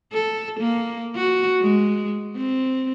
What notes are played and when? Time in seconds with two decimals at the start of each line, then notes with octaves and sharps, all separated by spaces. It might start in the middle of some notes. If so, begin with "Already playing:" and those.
0.13 A4
0.60 A#3
1.15 F#4
1.61 G#3
2.36 C4